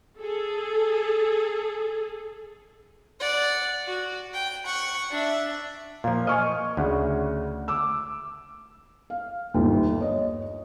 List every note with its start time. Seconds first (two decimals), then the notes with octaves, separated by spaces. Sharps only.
0.18 G#4 A4
3.20 D5 F#5
3.86 F#4
4.34 G5
4.65 F#5 C#6
5.11 D4 E5
6.04 A#2 F3 F5
6.27 D#5 G#5 C#6 F6
6.77 D2 C#3 F#5
7.68 D6 E6
9.10 F5
9.54 G1 D#2
10.01 C#5 D#5